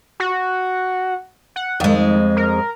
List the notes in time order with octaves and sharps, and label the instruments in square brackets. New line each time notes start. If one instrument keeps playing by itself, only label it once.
[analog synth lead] F#4
F#5
[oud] F2 G#3 [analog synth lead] D#3
[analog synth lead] A#4